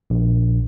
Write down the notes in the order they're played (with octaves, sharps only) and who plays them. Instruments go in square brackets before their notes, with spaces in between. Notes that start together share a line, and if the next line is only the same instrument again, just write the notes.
[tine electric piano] A#1